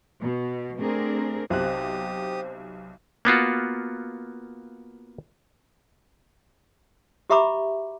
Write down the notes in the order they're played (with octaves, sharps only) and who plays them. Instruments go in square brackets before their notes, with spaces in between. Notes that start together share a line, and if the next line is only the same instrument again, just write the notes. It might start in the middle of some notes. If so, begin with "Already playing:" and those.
[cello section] B2
A3 C4 D4 G#4 A#4
[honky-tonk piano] B1 C3 F#6 [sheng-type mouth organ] G4 D#6 [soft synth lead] C5
[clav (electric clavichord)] A#3 B3 F4 F#4
[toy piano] F#4 G4 E5 A#5 B5 D6